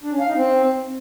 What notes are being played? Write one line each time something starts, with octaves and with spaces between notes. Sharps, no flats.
D4
C#4
F5
D#4
C4